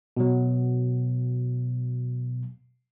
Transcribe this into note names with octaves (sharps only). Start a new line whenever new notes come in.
B2 F#3